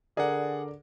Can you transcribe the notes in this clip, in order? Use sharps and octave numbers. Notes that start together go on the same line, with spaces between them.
D3 G#4 A#4 D5 F#5